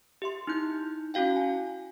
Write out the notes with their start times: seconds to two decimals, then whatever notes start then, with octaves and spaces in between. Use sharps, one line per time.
0.22 G4 E5 C6
0.47 D#4 E4 G6
1.14 C#4 E4 F#4 F5 G5
1.36 G#5